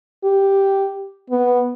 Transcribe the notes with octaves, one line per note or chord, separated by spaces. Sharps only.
G4
B3